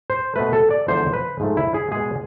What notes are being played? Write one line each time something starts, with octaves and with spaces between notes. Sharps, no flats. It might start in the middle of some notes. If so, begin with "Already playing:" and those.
C5
B2 A3 B4
A4
D5
E2 D3 F3 G#3 C5
B4
G#2 F3 A3
E4
G#4
B2 G#3 G#4